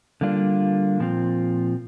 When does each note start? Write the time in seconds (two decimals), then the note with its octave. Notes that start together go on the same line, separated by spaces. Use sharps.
0.21 D3 G3 A#3 D4 F4
1.00 A#2 F3 C4 F4